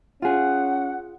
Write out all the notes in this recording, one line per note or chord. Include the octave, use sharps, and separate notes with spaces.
C#4 F4 G#4 F#5